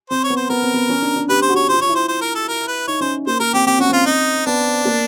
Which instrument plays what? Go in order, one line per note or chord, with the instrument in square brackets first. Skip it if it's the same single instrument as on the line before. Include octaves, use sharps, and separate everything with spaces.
[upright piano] C4 [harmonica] C5
[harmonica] C#5
[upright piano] B3
[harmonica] C5
[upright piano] B3 [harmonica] A#4
[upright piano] C4
B3
C#4
D4
D4
[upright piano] G4 [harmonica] B4
[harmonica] C5
[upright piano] F#4
[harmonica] C#5
[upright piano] F4 [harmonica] C5
[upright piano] F4 [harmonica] C#5
[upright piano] E4
[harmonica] C5
C5
A#4
A4
A#4
B4
[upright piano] D#4 [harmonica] C#5
[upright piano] C#4 [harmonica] C5
[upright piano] A#3 [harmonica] C5
[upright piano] A#3 [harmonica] A#4
[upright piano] C4 [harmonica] G4
[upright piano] C4 [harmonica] G4
[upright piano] C#4 [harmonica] F#4
[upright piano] C4 [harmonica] F4
[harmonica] D#4
[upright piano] B3 [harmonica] D4
[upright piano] A#3